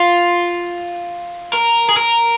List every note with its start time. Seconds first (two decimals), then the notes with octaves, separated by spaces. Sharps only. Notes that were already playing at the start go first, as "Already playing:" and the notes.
Already playing: F4
1.53 A#4
1.89 G#4
1.97 A#4